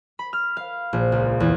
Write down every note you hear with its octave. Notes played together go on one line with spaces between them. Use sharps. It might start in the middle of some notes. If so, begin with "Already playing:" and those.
B5
F6
F5
A#1
C#2
E2